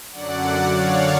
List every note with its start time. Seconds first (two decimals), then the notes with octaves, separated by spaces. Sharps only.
0.12 F#2 D3 F#3 D5 F#5
0.70 C#5 F5